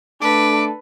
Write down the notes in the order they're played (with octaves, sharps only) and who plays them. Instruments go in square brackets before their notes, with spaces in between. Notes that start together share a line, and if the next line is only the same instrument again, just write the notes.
[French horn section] A3 D4 [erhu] A4 [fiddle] B4 [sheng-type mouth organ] D6